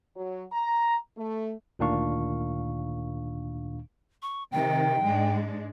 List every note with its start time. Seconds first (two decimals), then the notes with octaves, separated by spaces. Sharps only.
0.16 F#3
0.53 A#5
1.18 A3
1.79 D2 A#2 D#3 D4 F5 C#6
4.22 C#6
4.52 C3 D#3 G5
5.01 G#2 G#3 D4